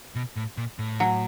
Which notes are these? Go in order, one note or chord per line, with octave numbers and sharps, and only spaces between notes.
B2
A2
A#2
A2
F#3